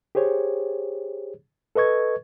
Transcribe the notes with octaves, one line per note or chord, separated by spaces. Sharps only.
G4 G#4 C5 C#5
A4 B4 D#5 C#6 G#6